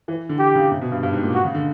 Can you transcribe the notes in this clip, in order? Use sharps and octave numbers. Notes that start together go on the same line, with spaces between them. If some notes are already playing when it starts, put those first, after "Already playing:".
E3
D3
G4
C#3
C3
B2
G2
G2
G#2
A#2
F#4
C#3
D3